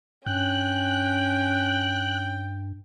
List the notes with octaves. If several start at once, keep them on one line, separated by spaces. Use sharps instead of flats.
G2 C#4 G5 F#6